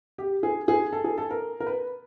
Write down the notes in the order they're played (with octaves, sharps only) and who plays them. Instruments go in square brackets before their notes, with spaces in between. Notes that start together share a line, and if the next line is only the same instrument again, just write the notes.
[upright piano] G4
G#4
G#4
A4
G#4
A4
A#4
A#4
B4